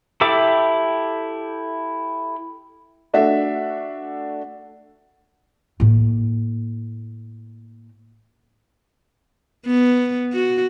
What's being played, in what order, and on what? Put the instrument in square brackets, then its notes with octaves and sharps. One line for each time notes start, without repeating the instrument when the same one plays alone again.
[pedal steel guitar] E4 G4 A4 E5 D6
[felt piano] A3 D4 F#4 E5
[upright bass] A2 A#3
[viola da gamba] B3
F#4